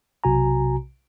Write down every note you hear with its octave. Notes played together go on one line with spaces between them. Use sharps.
B1 C3 F#4 G#5 A#5